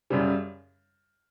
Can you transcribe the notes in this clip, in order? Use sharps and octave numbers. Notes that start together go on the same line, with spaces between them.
F#2 C#3 G3